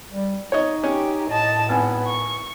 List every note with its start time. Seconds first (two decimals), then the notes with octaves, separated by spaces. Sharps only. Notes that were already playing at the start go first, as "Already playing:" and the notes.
0.12 G3
0.52 D#4 C#5 D#5
0.84 C#4 G4
1.29 A2 D#5 A5
1.69 G#1 B3 G#5
2.06 C#6